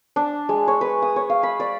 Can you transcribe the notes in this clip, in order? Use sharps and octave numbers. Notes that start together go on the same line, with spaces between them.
D4
G#3
C#5
B4
D#6
C#5
F5
B5
D5